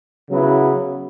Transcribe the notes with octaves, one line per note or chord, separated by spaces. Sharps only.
C#3 F#3 B3 E4